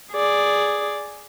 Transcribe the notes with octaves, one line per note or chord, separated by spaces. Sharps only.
G#4 D5